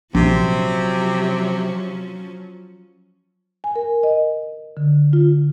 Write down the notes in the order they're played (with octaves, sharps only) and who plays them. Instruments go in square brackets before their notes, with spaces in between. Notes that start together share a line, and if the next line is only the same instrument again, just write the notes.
[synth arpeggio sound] A#1 [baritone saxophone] C3 [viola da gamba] F3 F#3 C#4
[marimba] G#5
A#4
D#5
D3
F4